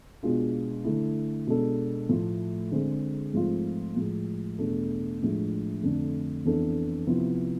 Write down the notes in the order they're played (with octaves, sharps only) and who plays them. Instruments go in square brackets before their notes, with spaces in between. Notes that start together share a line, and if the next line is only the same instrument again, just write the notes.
[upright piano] B2 G#3 D4 F4 G#4
D3 A3 E4
B2 G#3 D4 A4
A2 F3 A3
D3 G#3 C4 G#4
G#2 F3 A3 C4 F4
A2 F3 G#3
E2 B2 A3 D4 A4
A2 F3 G#3 D4
F2 D3 A3 D4
F2 E3 B3 D4 A4
C3 F3 B3 E4